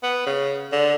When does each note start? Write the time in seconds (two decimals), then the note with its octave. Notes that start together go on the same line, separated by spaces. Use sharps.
0.03 B3
0.27 C#3
0.72 D3